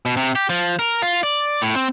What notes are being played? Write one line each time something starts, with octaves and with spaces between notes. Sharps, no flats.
B2
C3
G4
F3
A#4
F4
D5
A2
C4